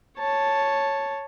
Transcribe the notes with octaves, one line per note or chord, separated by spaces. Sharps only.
C#5 A5